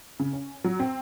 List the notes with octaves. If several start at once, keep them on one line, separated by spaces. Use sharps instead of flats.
C#3
C#4
F#3
C4